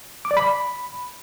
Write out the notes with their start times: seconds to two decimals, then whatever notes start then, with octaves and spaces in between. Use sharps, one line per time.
0.25 D6
0.31 D5
0.37 B5